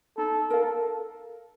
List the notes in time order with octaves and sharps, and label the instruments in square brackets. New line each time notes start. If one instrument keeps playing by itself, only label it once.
[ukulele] D#4 [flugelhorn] A4
[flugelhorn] A4 [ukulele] A#4 F5